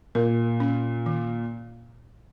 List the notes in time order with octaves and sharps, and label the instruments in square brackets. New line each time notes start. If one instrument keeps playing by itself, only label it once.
[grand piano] A#2 [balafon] A#4
[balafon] C#4
D#3